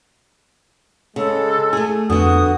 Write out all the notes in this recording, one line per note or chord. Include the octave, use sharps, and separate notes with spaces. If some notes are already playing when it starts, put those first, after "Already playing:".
C#3 G#3 A4
A3 G#4
F2 D3 B3 F#4 D#6